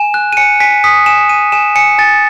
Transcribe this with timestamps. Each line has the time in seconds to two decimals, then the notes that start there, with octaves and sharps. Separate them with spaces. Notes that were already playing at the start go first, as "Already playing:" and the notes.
Already playing: G#5 E7
0.14 F#6
0.33 D#7
0.37 G#5 C#7
0.60 G#5 B6
0.84 D#6 B6
1.06 G#5 E7
1.29 G#5 D#7
1.52 G#5 E7
1.76 G#5 C#7
1.98 G#5 A6